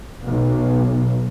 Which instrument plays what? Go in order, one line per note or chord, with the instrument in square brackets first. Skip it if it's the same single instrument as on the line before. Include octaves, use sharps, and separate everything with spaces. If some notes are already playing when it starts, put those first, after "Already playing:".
[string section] B1